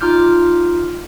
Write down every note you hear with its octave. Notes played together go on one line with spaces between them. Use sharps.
D#4 F4 D6 F6 G6